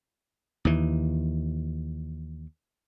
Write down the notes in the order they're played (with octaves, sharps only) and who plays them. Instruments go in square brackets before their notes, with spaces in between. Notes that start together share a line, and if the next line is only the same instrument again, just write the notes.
[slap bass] D#2 E3